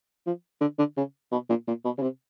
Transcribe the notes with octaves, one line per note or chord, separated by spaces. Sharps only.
F3
D3
D3
C#3
B2
A#2
A#2
B2
C#3
C3